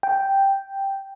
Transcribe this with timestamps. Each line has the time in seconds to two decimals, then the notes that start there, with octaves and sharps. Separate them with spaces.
0.03 G5